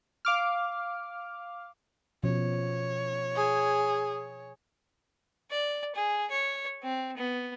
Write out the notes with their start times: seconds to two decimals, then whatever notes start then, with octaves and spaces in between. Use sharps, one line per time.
0.25 F5 D6 F6
2.23 B2 F3 C#4 C#5
3.36 G#4
5.50 D5
5.95 G#4
6.31 C#5
6.83 C4
7.17 B3